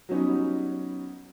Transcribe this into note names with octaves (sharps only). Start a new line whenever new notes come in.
F#3 G3 B3 C#4 D#4